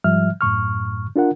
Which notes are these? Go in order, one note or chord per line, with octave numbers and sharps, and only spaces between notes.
G#2 F3 G3 E5 F6
F#2 A2 C#6 F6
D4 F4 A#4 F#5